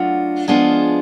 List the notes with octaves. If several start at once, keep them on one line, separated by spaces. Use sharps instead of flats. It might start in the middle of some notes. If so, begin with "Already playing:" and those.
Already playing: F#3 A3 D4 F4 F#4
F3 G#3 B3 D4 F4 G#4